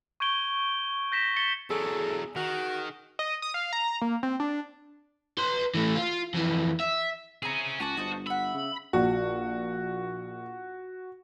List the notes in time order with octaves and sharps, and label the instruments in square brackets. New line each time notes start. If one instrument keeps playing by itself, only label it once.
[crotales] C#6 G6 G#6 D7 G7
G6 A#6 B6 E7
A6 C#7 G7
[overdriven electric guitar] E2 F#3 [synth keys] G#4 [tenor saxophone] A4
[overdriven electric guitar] D#3 [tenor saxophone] F#4
[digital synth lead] D#5
D#6
F5
A#5
A#3
C4
D4
[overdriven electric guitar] B4 C6
E3 A3
F4
F2 E3
E5
[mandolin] C4 E4 A#5 [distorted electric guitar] C#4 G#4
[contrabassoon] C#2 [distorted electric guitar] F#4 [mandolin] G#5 A5 D6
[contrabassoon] G1 [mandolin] C5 D#5 A5
[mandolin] E5 F#5 [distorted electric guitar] B5
[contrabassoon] C#3
[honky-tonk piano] A#1 [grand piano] F#4